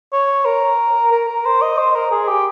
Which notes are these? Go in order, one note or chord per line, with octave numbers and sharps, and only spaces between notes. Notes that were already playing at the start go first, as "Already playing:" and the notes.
C#5
A#4
A#4
A#4
C5
D#5
C5
A#4
G#4
G4